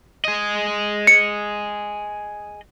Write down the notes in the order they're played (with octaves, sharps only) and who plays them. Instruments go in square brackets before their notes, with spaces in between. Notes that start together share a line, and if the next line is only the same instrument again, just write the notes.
[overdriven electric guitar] G#4 D#5
[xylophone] C#7